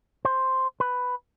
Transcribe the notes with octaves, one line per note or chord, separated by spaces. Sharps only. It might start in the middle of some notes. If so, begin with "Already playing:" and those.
C5
B4